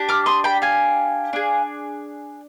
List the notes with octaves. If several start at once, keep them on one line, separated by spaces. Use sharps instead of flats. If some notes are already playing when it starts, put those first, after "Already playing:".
Already playing: D4 G4
D6 F6
C6 D#6
G5 B5
F5 G#5
D4 G#4